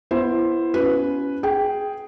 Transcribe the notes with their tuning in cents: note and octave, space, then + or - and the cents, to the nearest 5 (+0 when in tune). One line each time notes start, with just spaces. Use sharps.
B3 +0 E4 +25 C5 +10
C#4 +20 F#4 +0 B4 +0
G#4 +0 G5 +0